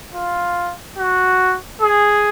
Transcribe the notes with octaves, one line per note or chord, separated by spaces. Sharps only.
F4
F#4
G#4